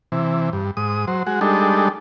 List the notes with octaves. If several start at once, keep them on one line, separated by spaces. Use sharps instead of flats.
C3 E3
G2
G#2 D#6
F#3 C5
G#3 F#4
G3 G#3 D4 D#4 A4